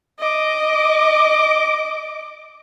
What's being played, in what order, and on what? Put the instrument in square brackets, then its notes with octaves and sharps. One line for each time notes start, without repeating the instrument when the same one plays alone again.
[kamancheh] D#5 D6